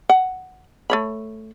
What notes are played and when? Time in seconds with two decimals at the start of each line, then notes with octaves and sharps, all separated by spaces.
0.09 F#5
0.90 A3 C#5 B5